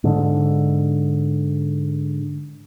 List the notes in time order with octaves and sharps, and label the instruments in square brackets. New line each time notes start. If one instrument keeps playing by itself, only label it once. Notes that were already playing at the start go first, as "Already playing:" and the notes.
[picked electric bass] G#2 D3